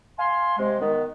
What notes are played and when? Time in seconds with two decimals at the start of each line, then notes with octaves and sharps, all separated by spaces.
0.18 F5 G#5 C6
0.58 C3 G#3
0.80 D#3 B3